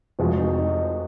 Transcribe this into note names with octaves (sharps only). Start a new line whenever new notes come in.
F1 F2 F3 G#3 F#4
D#4
D#4